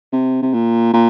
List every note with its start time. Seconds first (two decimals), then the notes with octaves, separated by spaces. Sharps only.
0.13 C3
0.42 C3
0.53 A#2
0.93 A#2